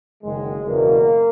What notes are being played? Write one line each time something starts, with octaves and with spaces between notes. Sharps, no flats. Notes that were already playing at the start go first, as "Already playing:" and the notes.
F#1 F#2 D#3 G#3
F#1 E2 B2 A#3